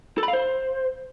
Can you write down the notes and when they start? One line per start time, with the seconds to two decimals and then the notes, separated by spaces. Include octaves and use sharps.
0.18 A4
0.23 B5
0.28 F5
0.33 C5